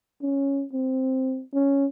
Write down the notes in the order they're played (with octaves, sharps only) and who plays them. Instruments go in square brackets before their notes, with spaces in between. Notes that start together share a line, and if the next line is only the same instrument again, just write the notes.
[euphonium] C#4
C4
C#4